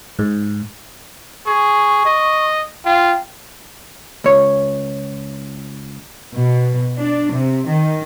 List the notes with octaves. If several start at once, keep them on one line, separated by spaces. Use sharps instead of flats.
G#2
G#4 C#6
D#5
F4 G5
C#2 C#5
B2
D4
C3
D#3